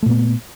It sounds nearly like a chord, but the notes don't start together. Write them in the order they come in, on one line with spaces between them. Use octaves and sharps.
A3 A#2 B3